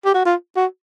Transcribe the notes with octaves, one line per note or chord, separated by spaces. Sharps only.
G4
F#4
F4
F#4